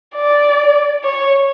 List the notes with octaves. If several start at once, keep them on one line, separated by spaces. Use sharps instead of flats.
D5
C#5